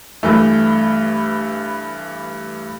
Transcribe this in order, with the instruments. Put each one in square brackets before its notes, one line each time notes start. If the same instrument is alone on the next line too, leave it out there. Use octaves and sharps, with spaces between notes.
[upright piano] G2 E3 A3